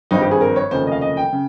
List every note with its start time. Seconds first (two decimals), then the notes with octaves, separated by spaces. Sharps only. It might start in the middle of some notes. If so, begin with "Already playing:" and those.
0.11 G#1 G2 F3 C4 D#4
0.21 G4
0.31 G#4
0.41 A#4
0.56 C#5
0.71 F1 D#2 C#3 F3 C5
0.87 D#5
0.92 F5
1.01 D#5
1.17 G5
1.33 C#3